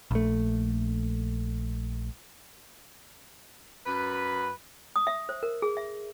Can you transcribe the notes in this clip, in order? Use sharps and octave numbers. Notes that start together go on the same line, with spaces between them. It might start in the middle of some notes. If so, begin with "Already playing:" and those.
A#1 A3
F#2 B4
D#6
E5
C5
A#4
G#4
E5